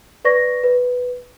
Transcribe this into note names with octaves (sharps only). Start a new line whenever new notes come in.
B4 D5 C#6 A#6
B4